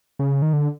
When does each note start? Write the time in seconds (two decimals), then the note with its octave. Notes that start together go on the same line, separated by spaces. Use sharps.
0.19 C#3
0.42 D#3
0.53 D3